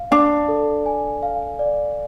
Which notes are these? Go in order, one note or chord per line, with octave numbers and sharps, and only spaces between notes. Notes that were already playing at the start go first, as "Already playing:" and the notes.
Already playing: F5
D4 D5
A4
G#5
F5
D5